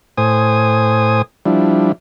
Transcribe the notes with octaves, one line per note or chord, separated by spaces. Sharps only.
A2 C5 G#5 D#6
F3 G3 D4 E4